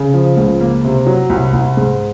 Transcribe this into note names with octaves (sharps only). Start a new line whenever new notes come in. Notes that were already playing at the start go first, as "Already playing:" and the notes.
Already playing: C#3
F3
C#2
A#3
C3
F#3
C2
C2
G#2